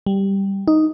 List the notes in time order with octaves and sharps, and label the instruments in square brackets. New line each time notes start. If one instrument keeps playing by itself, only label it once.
[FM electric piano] G3
D#4